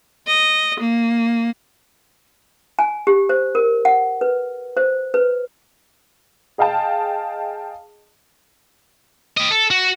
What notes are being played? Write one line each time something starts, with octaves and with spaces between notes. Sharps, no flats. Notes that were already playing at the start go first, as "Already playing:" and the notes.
D#5
A#3
G#5
G4
C5
A#4
F#5
B4
C5
B4
G#4 D#5 F5 G5 A5
G4 D#5
A4
F#4